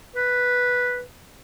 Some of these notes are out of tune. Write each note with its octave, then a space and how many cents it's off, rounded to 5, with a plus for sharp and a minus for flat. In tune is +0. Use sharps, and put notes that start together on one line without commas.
B4 -5